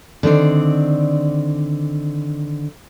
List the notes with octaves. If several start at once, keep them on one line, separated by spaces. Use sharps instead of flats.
D3 D#3 C4 D5